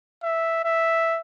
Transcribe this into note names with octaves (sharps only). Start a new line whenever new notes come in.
E5
E5